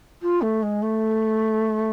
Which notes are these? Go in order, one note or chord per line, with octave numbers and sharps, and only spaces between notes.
F4
A3
G#3
A3